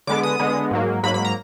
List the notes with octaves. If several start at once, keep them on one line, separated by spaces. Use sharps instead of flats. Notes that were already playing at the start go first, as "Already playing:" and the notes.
D3 G#3 B3 D6
D#6
D3 G#3 B3
G#2 F#3 A#3
G#2 F#3 A#3 B5
B5
A#5